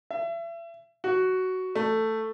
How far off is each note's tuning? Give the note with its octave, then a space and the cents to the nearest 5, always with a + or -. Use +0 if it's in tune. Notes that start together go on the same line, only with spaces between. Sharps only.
E5 +35
F#4 +10
A3 +10